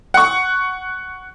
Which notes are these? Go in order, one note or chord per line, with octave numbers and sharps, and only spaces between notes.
F#5 C#6